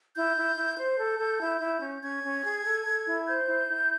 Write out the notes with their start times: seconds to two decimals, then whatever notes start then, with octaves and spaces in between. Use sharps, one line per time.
0.15 E4 G6
0.36 E4
0.56 E4
0.77 C5 G6
0.99 A4
1.19 A4
1.40 E4
1.61 E4
1.81 C#4
2.02 C#4 G#6
2.23 C#4
2.44 G#4
2.64 A4
2.86 A4
3.06 E4
3.26 C5 G6
3.48 E4
3.68 E4